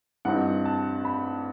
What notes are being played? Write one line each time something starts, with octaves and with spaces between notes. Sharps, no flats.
G2 E3 G3 C4 D#4 F#5
A5
B5